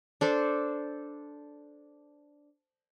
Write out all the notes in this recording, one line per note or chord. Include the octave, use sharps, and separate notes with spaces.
D4 A4 C5